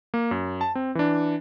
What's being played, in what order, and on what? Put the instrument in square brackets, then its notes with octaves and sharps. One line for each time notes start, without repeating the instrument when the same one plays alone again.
[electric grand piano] A#3
F#2
A5
C4
E3 D4